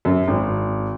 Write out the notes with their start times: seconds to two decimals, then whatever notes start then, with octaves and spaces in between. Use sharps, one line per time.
0.05 F#2
0.28 G#1